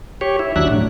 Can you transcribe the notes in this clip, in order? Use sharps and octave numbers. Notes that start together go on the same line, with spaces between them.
G4 C#5
E4
D#2 F#3 D4 E5 F#6
A2